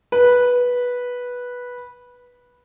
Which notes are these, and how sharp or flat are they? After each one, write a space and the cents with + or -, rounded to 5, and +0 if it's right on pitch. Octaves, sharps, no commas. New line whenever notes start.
B4 -10